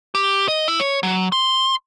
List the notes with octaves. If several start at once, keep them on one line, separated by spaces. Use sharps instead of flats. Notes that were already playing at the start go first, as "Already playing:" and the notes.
G4
D#5
E4
C#5
F#3
C6